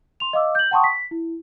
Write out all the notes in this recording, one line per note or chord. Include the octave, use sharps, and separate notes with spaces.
C6 F7
D#5 F5 D6 E6
G6 F#7
F#5 G5 A5 C6 C#6 D#6
B6
E4